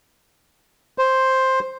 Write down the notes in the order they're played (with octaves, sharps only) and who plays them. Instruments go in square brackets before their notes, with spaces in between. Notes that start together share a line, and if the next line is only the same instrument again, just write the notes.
[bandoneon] C5